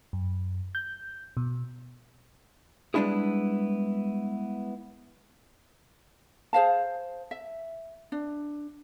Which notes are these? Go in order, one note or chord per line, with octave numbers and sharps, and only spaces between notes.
F#2
G6
B2
G3 G#3 B3 D4 E4 G#4
G#4 C5 F5 A5
E5
D4